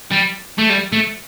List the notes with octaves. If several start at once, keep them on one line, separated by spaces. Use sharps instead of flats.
G3
A3
G3
A3